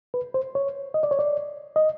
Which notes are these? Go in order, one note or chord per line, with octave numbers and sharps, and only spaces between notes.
B4
C5
C#5
D#5
D5
C#5
D5
D#5